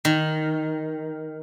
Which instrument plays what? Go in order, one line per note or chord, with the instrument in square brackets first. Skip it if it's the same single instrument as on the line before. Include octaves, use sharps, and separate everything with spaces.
[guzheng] D#3